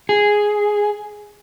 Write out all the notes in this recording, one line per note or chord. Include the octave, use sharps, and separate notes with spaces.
G#4